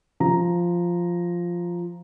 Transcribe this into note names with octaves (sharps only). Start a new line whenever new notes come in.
F3 A#5